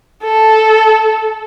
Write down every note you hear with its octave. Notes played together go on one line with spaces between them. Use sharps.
A4